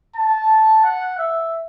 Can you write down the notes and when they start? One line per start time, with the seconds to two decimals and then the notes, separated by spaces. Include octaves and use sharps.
0.16 A5
0.84 F#5
1.18 E5